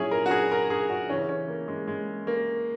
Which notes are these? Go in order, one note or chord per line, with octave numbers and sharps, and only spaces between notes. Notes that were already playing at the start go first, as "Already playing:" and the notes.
Already playing: A#2 F#3 C#4 E4 G#4
A#4
F#4
G#4
A#4
G#4
F#4
C#3 E3 C#4
C#4
A#3
G#3
G#3
A#3